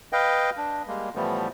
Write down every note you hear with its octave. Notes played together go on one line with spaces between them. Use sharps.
B4 D#5 F5 G5
D4
G3 G#3 A#3
A2 E3 F3 G3 A3 B3